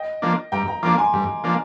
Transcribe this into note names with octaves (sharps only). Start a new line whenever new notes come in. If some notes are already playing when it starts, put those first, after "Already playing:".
Already playing: D#5 G5
F3 A#3 D4
G2 G5 A#5
G5 A#5
F3 A#3 D4 A#5 D6
G#5 C6
G2
F3 A#3 D4